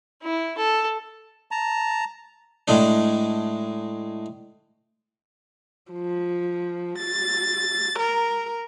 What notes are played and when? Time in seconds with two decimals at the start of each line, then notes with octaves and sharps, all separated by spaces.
0.22 E4
0.58 A4
1.51 A5 A#5
2.68 A2 G#3 D4
5.91 F3
6.98 A6
7.98 A#4